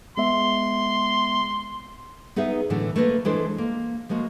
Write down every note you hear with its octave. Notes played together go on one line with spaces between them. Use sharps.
G#3 B3 E5 C6
B3 D#4 G#4 B4 E5
A2 D3 E3 F#3 A3
A3 A#3 F4 B4 C5 D#5
E3 G#3 D4 E4 A4 C5
A#3
F3 G#3 A#3 F#4